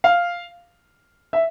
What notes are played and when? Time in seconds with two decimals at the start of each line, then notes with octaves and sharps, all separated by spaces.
0.04 F5
1.33 E5